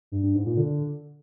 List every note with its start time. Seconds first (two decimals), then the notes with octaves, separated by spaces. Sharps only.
0.12 G2
0.23 G2
0.34 G#2
0.46 A#2
0.57 D3